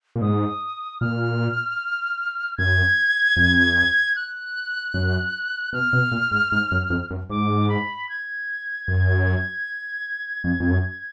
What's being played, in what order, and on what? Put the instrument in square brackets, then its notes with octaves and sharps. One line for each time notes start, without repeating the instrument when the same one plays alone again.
[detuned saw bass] A#2
[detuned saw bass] G#2 [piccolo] D#6
[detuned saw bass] A#2 [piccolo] F6
[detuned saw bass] F#2 [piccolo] G#6
[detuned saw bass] F2
[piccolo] F#6
[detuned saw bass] F#2
[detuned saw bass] B2 [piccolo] F6
[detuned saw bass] B2
A#2
G#2
G#2
F#2
F2
F#2
[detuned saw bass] G#2 [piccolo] D6
[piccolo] B5
G#6
[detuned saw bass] F#2
F2
F2
F#2